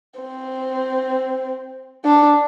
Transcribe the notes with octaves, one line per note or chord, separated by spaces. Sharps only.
C4
D4